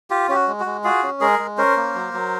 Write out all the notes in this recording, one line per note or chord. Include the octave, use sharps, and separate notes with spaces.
F4 G4
C#4 G4
F#4
G#3
F#4
G#3
F4 F#4 G#4
C#4
G#3 G#4 A#4
G#3
C#4 A#4 C5
A#3
F#3
F#3